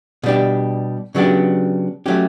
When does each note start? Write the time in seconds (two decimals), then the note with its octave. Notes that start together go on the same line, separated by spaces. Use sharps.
0.23 B2 G3 D4 G4
1.15 C#3 F#3 B3 D4 G4
2.06 F#3 A3 C#4 G4